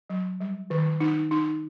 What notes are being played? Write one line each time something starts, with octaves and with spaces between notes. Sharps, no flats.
F#3
G3
D#3
D#4
D#4